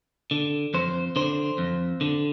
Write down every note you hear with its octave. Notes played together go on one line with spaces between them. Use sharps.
D3
F2 C5
D3 C5
F2
D3